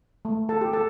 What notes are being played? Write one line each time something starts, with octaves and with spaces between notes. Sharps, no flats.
A3
A4 A5
G4
A4 A5